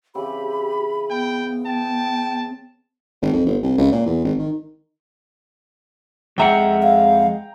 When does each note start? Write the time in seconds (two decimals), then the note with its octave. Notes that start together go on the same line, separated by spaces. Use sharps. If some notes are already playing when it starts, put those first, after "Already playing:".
0.15 C#3 E3 C4 G4 B5
1.10 B3 G5
1.66 G5 A5
3.22 G#1
3.33 F2
3.46 G1
3.63 C2
3.78 C#2
3.92 A#2
4.06 E2
4.24 G#1
4.39 D#3
6.38 F2 G#3 E5 F#5 G5 A#5
6.82 F5